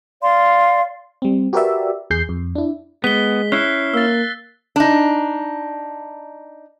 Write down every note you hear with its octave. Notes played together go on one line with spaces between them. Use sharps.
D5 F5 C6
G3 C4
F#4 G4 A#4 B4 D5 E5
E2 G#4 G6 C7
F2
D4 E4
G#3 B3 B6 G7
C#4 E4 F#6 C7 G7
A#3 E6 A6
D4 D#4